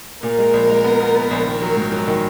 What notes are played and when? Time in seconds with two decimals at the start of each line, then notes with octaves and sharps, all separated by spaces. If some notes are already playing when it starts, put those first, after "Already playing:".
0.23 A#2 A#4
0.39 G#3
0.53 A#1
0.69 G#3
0.84 B3
1.00 B3
1.15 B3
1.31 A#1
1.46 D#3 A#4
1.62 F#3
1.77 G#2
1.92 F#3
2.08 D#3